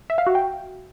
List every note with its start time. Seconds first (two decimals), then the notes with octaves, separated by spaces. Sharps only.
0.10 E5
0.18 F5
0.27 F#4
0.35 G5